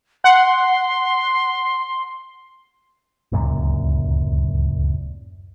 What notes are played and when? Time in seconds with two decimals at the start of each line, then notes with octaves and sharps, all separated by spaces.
0.24 F#5 C6
3.32 D1 C#2 F#2 A#2